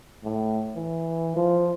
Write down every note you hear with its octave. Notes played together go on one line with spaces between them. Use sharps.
A2
E3
F3